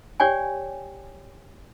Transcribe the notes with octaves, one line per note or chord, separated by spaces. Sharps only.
G4 C#5 D5 G5 G#5